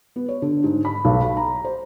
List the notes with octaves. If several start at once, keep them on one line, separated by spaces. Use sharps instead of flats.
B3
C#5
D3
G#2
B5
B1
B5
A#5
C5